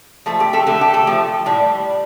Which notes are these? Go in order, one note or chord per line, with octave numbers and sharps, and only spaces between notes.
F3 A3 A4
G4
A3 A4
D3 A3 A4
G4
A3 A4
F3 A3
A2 G3